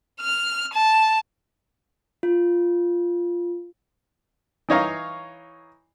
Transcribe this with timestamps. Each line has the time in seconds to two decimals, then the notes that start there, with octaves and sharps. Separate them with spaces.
0.20 F6
0.73 A5
2.23 F4
4.69 E3 D#4 C#5 F5 A#5